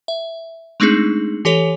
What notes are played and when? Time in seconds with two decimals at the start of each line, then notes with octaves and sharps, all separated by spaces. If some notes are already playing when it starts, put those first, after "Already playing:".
0.08 E5
0.80 G#3 A3 C4 D4 D#4 G#4
1.45 E3 G4 A4 C#5